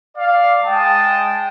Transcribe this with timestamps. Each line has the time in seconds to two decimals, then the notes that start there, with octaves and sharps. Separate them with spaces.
0.16 D5 F5
0.64 G#3 G5 A5 D#6